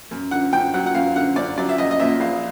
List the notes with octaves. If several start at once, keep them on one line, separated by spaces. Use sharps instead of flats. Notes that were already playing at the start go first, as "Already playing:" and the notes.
F#2
D3 F#5
F#2 G5
F#3 F#5
F#5
F#2 F5
D3 F#5
F#2 D5
F#3 D5
E5
A#1 D#5
D#5
A#2 E5
A#1 F5